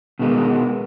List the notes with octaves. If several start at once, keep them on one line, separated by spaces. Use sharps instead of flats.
B2 D#3 G#3 B3 A#4